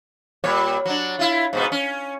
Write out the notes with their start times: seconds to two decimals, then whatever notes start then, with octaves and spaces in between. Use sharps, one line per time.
0.44 A#2 G3 C#5
0.85 F#3 D4
1.19 E4 F4
1.53 G#2 B2 B3
1.72 C#4